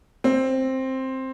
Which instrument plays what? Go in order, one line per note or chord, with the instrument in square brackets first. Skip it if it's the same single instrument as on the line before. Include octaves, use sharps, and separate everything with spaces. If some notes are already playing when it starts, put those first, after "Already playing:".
[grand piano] C4